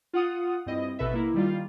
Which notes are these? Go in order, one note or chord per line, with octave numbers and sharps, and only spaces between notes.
F4 F#5 D#6
G2 C4 E4 D#5
A1 B2 A4 B4 E5
A#3 E4
D#3 G3 F4